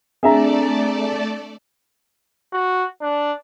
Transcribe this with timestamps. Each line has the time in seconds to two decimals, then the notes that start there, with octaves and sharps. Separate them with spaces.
0.23 A3 C4 D4 G#4 A4 D5 E5 A#5
2.53 F#4
3.01 D4